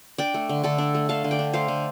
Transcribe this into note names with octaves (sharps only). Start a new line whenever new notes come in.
D4 D5 G5
A3
D3
D3 A4 D5
D4
A3
D3 F5 A5
D3
D5 G5
D4
A3 C5 F5
D3